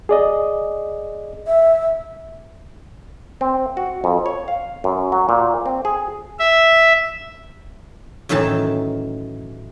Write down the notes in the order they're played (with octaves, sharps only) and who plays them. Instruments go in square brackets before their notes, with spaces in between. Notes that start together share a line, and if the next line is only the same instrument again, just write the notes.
[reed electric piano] G#4 D5 D#5
[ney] E5
[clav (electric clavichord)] C4
F#4
F2
C#5
F5
F#2
F#3
A#2
C4
G#4
[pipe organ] E5
[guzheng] F#2 A2 D#3 E3 A5